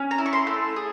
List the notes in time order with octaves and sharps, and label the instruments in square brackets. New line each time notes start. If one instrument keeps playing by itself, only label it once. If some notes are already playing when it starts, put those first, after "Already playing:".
Already playing: [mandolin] C#4
A#5
E4
C#6
C6
A3
G#4